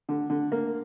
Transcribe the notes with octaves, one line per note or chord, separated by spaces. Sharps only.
D3
D3
A#3